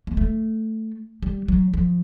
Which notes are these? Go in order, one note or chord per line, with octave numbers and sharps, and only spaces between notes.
A#3
A3
G3
F#3
F3